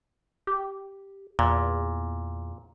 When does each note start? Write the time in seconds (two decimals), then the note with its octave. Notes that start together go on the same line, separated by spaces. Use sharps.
0.47 G4
1.39 E2 A#2